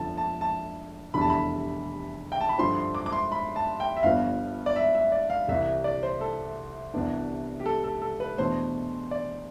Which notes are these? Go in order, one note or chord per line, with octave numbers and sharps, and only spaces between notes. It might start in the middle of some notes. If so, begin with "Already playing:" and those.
Already playing: G1 F2 D3 F3 A5
A5
A5
F1 E2 D3 G3 D4 B5
A5
B5
G5
A5
B5
G2 D3 F3 C4 C6
C6
D6
D6
C6
B5
A5
G5
E5
G1 G2 F3 B3 F5
D5
E5
E5
D5
F5
C2 C3 E3 E5
D5
C5
A4
C2 C3 E3 B3 D4
G4
A4
A4
A4
B4
E2 B2 A3 D4 C5
D5